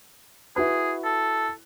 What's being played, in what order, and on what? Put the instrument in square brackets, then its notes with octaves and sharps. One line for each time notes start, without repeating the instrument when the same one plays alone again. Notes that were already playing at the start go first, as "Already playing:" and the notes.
[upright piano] E4 F#4 B4 [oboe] G#4
[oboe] A4